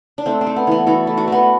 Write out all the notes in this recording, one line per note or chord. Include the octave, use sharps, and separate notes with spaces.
D4
A3 C4
C4
A3
B3
E3 B3
E3 F#4 A4
A3
D4 F#4
A3 B3